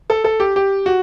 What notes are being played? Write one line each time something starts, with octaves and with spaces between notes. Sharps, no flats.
A4
A4
G4
G4
F#4